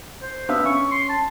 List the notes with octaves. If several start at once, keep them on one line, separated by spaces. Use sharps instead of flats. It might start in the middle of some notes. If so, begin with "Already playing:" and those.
C5
B3 D4 E5 F5
C#4 C#6
C6
A5